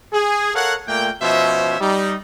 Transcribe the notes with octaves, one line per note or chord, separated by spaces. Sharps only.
G#4
A4 A#4 C#5 F5 F#5
A#2 A3 A#3 G5
B2 F3 C#4 C5 E5
G3 D#4